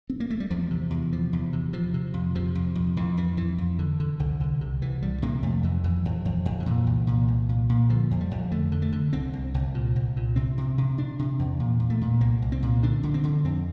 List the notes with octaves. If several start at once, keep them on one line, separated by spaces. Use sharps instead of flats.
C4
A#3
A3
G3
E2 F3
C3
E2
C3 F3
E2
C3
C3 F3
C3
F2
C3 F3
F2
F2
F2 E3
F2 E3
F2 E3
F2
D3
D3
C2 D3
C2 D3
C3
C2 E3
C3 G3
C3 A#3
F2 A3
F2 E3
F2 E3
F2
F2
F2
D3
A#2 E3
C2
A#2
C2
A#2
A#2
D3 F3
F2
G3
F2
D3 A3
D3
A3
D3
C2 C4
C2
C2
A#2
C2
A#2
C3 C4
C3
C3
C3 D4
C3
E2
A#2
A#2
A3
A#2
C2 A#3
C2
C4
A#2
D3 D4
D3
C4
D3
F2 C4